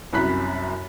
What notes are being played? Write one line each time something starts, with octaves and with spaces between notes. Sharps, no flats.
C2 F#2 B5 F#6 B6